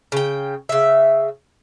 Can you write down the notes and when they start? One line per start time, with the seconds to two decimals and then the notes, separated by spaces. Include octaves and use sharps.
0.12 C#3 G5
0.69 C#3 E5